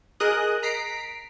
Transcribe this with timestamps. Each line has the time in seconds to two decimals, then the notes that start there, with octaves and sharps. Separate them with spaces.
0.20 G#4 A#4 D#5 D#6 F#6
0.63 A#5 B6 C7 D7